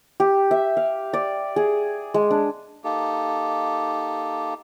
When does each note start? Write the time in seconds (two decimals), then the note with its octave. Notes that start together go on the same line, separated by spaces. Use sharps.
0.20 G4
0.51 E5
0.77 F5
1.13 D5
1.56 G#4
2.14 G#3
2.31 D4
2.84 A#3 D#4 G4 A4